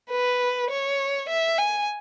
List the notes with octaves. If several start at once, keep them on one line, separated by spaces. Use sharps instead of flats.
B4
C#5
E5
G#5